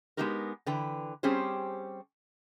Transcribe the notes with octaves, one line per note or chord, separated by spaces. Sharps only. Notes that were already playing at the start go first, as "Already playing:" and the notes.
G#3 B3 C#4 D#4 G4 A#4
D3 E3 B4 G5
G3 C4 C#4 G4 G#4 C5